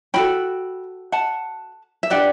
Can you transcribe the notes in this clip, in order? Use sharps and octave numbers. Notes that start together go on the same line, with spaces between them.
C#4 F#4 A4 G5 B5
F#5 A5
E5
D4 G4 B4 D5 F#5